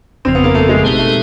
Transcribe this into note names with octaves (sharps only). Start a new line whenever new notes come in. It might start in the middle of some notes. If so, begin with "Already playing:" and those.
G1 F2 C#3 F3 C4
B3
A#3
A3
G#3
B2 G#3 A3 C4 D#4 G4
A3